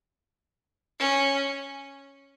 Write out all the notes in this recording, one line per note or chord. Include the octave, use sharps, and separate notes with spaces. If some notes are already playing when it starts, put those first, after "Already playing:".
C#4